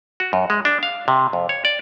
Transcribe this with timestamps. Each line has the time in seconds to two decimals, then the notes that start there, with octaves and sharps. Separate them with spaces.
0.20 F#4
0.33 F#2
0.50 G#3
0.65 D4
0.83 F5
1.08 C3
1.33 F2
1.49 C#5
1.65 D5